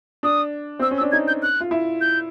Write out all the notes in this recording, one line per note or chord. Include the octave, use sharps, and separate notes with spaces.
D4 D#6
C4 E6
C#4
E6
D4
D#4 G#6
G6
F#6
F4
E4
G6